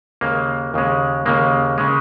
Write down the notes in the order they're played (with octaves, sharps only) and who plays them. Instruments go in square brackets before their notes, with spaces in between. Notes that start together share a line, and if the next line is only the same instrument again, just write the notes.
[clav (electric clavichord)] D#2 C#3 G#3 A#3
D#2 C#3 G#3
D#2 C#3 G#3 A#3
C#3 G#3